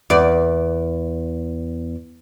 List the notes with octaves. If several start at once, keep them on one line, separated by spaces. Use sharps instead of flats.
E2 D5